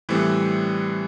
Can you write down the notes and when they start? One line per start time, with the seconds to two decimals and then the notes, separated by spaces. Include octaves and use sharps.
0.09 A2 E3 G3 C4 B4